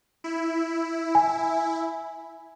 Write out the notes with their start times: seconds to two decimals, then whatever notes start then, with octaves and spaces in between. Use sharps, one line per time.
0.24 E4
1.15 G#5